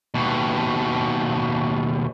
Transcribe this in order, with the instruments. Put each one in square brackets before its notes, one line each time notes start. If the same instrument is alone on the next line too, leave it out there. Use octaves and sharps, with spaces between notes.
[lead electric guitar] D#2 B2